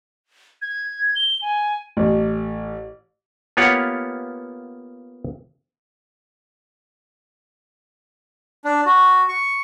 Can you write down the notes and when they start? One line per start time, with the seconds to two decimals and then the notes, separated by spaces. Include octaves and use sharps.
0.62 G#6
1.16 G7
1.42 G#5
1.97 A1
3.57 A#3 B3 F4 G4 C#5 F#5
8.65 D4
8.86 F#4
9.29 C#6